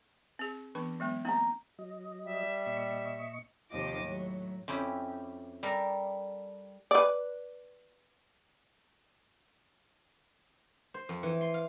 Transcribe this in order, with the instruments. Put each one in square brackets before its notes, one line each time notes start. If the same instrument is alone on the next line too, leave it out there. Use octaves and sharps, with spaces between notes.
[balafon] C4 G#4
[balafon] E3 B3 C#6 [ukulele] D4
[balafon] F#3 G#3 B3
[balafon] A#3 C4 [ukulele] D#4 A#5
[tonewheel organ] F#3 D#5
[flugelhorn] G3 [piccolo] E5
[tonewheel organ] A#2 D#5 C#6
[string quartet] D#2 C3 F3 G4 D#5 D6
A2 F#3
[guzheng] F2 C#4 E4 G4
G3 A4 A#4
[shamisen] B4 D5
[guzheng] C5
F2
E3
C6
F5